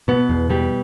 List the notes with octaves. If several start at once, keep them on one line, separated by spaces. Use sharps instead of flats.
B2 B3
E2
B2 G3